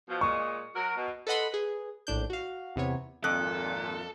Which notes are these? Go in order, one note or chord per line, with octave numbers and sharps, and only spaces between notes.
B2 F3
A#2 G#3 C#6
F#3 F#4 A#4
B2
A4 B4 D#5 F#5 B5 C6
G#4 B4
A#1 A2 D4 G6
F#4 F5
E2 C3 B3 C#5
G#1 F2 A#2 A4 F#6